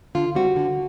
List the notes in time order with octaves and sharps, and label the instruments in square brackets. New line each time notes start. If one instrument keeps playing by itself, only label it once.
[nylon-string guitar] D3 F4
G3 C4 F#4
D3